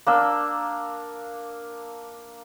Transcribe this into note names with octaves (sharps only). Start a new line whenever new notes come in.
A#3 D4 E6